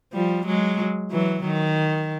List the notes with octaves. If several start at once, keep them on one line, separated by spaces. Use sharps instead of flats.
F3 G3
F#3 G#3
E3 F#3
D#3